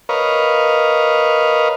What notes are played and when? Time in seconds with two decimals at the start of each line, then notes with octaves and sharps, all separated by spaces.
0.09 A#4 B4 C#5 D#5 F5